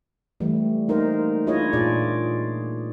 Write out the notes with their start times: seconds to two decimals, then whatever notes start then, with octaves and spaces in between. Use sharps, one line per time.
0.40 E3 G3 A3
0.88 A#3 D#4 A#4 C5
1.47 D4 E4 F4 G#4 C#5 D#5
1.73 A#2 F4 G#4 D5